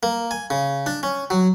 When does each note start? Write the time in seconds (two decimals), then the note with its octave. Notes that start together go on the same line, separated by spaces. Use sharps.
0.03 A#3
0.31 G#5
0.50 C#3
0.86 D4
1.03 C#4
1.30 F#3